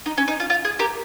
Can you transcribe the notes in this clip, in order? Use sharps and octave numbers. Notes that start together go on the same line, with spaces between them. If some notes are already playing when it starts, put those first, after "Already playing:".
D#4
C#4
D#4
F4
F4
G#4
G4 A#4